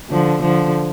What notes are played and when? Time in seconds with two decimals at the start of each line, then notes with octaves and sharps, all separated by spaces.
0.10 D3 F3
0.43 D3 F3